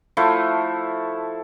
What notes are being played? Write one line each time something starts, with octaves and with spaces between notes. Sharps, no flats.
F3 A3 E4